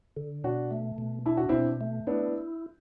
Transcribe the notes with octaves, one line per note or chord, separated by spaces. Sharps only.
D3
B2 D4 F#4
A3
B2
D4 E4
F#4
B2 C4 E4
A3
B3 D4 E4